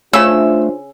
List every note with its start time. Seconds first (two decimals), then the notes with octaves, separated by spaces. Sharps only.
0.13 C#3 A3 C#4 D4 F4 C5 E6